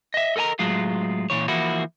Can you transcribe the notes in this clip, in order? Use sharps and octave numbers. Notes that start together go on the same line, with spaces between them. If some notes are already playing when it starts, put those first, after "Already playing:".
D#5 E5
A4 A#4 D#5 G#5 A#5
A2 F#3 G#3 F4
A#2 E3 C#5
E3 F3 A#3 E4 F#4